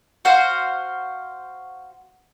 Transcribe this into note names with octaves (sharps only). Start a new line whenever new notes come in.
F#4 C5 F5